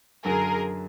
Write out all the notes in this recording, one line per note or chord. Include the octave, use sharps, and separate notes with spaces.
F#2 D3 F#3 G#4 A#4